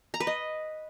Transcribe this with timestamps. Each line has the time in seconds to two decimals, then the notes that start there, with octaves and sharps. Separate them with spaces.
0.14 A#5
0.20 B4
0.27 D#5